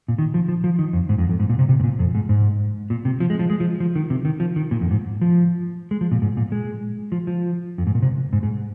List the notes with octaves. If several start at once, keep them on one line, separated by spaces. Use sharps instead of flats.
A#2
D#3
F3
F3
F3
D#3
F2
G#2
F2
F2
G#2
A#2
C3
C3
G#2
A#2
F2
G#2
G#2
A#2
C3
F3
G#3
F3
G#3
F3
F3
D#3
C3
D#3
F3
D#3
A#2
F2
G#2
F3
G#3
F3
A#2
G#2
A#2
G#3
F3
F3
F2
G#2
A#2
C3
G#2
G#2